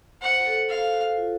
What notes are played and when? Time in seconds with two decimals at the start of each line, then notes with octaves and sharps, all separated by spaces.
0.22 C5 F#5
0.40 F#4
0.46 A4
0.69 A4 F5
0.93 F#4
1.16 F4